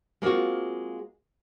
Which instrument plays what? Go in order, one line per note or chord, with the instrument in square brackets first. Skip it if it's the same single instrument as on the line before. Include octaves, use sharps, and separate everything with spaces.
[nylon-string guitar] G#3 A#3 C4 F4 F#4